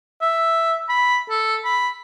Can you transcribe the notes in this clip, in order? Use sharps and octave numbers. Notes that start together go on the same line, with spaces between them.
E5
B5
A4
B5